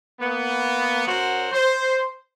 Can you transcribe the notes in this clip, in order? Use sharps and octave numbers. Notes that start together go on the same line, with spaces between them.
A#3 B3
F#2 F#3 F#4 A#4 C5
C5